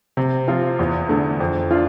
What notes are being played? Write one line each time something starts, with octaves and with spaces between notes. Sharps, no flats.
C3
F3 C4 F4
E2
D3 A3
F2
D4 F4